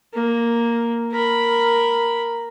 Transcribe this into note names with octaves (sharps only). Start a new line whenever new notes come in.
A#3
A#4 B5